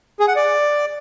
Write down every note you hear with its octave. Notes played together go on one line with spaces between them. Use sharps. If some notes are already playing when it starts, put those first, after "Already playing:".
G#4
F#5
D5